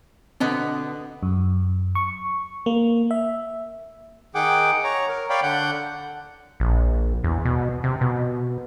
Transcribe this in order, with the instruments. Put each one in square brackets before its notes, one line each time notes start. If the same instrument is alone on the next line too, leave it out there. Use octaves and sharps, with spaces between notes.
[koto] B2 D3 B3 [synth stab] C4 D#5
[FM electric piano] F#2
C#6
A#3
E5
[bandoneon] D#3 G#4 F#5 G5 D6
C#5 A#5
A#4
C#5 D5 F5 G5 B5
D3 F#5 G6
[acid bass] A#1
E2
B2
C3
B2